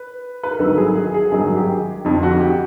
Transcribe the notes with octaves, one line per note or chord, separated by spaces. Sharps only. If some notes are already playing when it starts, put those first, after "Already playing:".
Already playing: B4
B4
A#4
G#1 G2 D#3 F#3 A4
G#4
G#4
G#4
G#1 G2 D#3 F#3 G#4
G4
F1 F2 D3 F3
F#4
G4